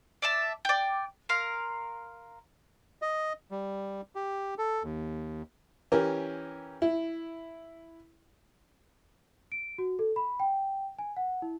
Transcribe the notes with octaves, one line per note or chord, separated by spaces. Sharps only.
D5 E5 A5
D5 G5
A#4 F5 C6
D#5
G3
G4
A4
D#2
E3 C#4 G4 A#4
E4
D7
F#4
A4
B5
G5
G#5
F#5
E4